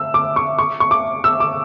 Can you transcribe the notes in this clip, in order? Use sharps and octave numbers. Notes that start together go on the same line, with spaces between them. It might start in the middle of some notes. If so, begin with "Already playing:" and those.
Already playing: E6
D6
C#6
C#6
C#6
D6
E6
D6